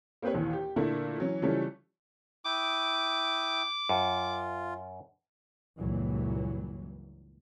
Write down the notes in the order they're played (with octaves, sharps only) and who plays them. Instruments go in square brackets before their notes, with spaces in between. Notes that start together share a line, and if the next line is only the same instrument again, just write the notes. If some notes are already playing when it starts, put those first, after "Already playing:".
[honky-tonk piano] A#3 C4 G4 B4 C#5
A#1 D#2 E3
G4
A#2 D3 A3 A#3 D4 E4
E3 F#3 C#4
C#3 E3 F3 G3 A3 C#4
[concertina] E4 G5 D#6 [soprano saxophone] D6
[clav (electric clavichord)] F#2 [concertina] F4
[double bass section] C#2 G2 A#2 E3 F#3